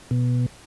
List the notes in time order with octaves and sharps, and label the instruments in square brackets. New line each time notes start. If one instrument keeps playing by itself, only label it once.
[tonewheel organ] B2